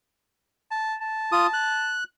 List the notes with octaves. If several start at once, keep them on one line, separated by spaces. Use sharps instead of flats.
A5
A5
F4 D#6
F#6